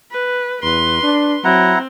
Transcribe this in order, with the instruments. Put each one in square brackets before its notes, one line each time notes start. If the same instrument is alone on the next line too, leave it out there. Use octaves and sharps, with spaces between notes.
[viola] B4
[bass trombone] E2 [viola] B4 C6
[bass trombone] D4
[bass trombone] F#3 [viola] C4 [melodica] E4 F#5 A#5